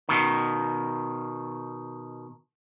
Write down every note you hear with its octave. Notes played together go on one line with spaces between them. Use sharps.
B2 D#3